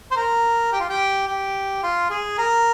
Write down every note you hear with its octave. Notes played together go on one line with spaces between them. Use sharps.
C5
A#4
G4
F4
G4
G4
F4
G#4
A#4